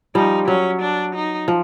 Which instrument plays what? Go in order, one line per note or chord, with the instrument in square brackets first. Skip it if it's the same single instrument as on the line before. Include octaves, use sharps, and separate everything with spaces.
[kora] F3 G3 [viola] D#4
[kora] F#3 [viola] C#4
[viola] D4
D#4
[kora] F3